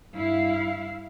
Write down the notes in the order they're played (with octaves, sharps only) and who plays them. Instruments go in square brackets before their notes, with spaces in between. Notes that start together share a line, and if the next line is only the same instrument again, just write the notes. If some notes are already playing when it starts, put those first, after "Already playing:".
[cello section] G2 E4 F5